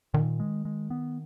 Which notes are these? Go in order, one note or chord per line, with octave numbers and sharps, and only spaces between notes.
A#2 D#3
G#3
G#3
B3